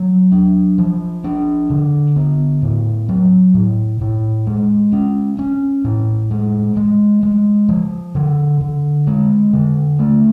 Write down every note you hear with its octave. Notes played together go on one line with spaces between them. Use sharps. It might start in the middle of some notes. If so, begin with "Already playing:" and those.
Already playing: F#3
D4
F3
D4
D3
B3
A2
F#3
A2
A2
G#3
C#4
C#4
A2
G#3
G#3
G#3
F3
D3
D3
G#3
D3
A3